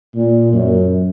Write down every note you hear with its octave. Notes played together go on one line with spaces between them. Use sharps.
A#2
F#2